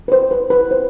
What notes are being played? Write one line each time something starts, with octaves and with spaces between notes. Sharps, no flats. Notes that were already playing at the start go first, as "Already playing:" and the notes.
B4
C5
B4
B4
C5